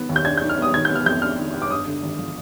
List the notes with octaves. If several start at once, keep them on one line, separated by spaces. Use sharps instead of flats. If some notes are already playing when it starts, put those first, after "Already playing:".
Already playing: D#3 B3
D#2
G6
D4 G#6
G6
D#3
F6
B3 D#6
D#3 G#6
B3 G6
F6
F2 G6
D4 F6
D#3
B3
D6
G2 D#6
D3
G#1
F3